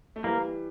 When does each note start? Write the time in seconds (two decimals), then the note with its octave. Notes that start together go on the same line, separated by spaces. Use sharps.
0.16 A3
0.24 E3 G3 A#3